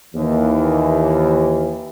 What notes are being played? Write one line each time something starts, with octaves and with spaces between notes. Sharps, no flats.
D#2 E3